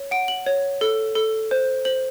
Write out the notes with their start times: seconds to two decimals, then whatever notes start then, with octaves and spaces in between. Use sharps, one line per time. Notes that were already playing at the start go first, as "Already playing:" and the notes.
Already playing: C#5
0.11 F#5 D7
0.28 F#7
0.46 C#5
0.81 A4
1.15 A4
1.51 C5
1.85 C5 F#7